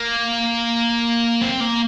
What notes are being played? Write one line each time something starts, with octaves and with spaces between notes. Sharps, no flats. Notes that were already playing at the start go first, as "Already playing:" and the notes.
Already playing: A#3
C4
A#3